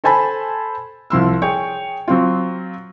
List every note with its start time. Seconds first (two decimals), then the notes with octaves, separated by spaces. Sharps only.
0.04 A4 C5 G#5 A5 B5
1.10 C2 F3 C6 E6
1.42 G#4 C#5 G5
2.08 F#3 C4 F4